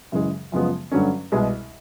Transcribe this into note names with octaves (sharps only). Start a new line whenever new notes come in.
F#2 C#3 E3 G#3
F#2 C#3 F3 G#3 B3
G2 D3 F#3 A3 C#4
C2 B2 G#3